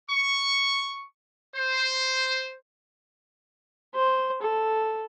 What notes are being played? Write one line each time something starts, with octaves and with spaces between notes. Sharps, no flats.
C#6
C5
C5
A4